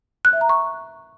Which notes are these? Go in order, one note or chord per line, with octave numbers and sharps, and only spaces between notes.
F#6
E5
A#5
C#6